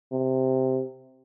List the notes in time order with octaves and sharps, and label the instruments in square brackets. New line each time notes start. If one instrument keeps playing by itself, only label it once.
[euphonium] C3